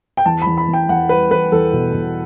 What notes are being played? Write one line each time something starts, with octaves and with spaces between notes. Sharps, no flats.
G5
E2 A5
E2 B5
B5
E2
G5
E2 F#5
G3 B4
E2 B4
E2 A4
B2
B2